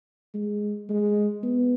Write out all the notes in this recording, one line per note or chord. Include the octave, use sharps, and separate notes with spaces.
G#3
G#3
B3